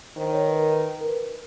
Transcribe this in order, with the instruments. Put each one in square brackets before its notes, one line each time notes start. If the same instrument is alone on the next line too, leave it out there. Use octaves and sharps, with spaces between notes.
[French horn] D#3 [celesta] C5
[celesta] C#5
B4
A#4
B4
A#4
B4